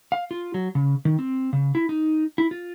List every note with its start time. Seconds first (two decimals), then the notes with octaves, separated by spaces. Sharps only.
0.12 F5
0.31 F4
0.54 F#3
0.75 C#3
1.05 D#3
1.19 C4
1.53 C#3
1.75 E4
1.89 D#4
2.38 E4
2.51 F4